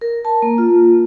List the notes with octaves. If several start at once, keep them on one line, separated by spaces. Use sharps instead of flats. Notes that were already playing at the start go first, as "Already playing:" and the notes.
A#4
A5
A#3
F4